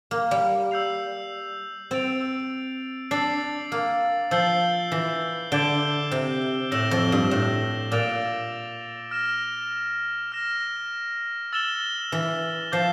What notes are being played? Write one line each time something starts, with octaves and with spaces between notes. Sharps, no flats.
A#3
G3
E6 G6 C7 F7
C4 A6 D7 F7
D4 E6 A6 C7
A#3
F3 E6 G6 C7 G7
E3
D3 D6 G6 D7 G7
C3
A2 E6 A#6 E7 G7
F2
G2
A2
A#2 D6 A6 D7 F7
F6 A#6 E7
F6 A#6 E7
E6 A6 E7 G7
E3
F3 D6 G6 C7